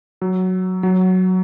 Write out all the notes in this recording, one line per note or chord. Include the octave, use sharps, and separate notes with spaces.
F#3
F#3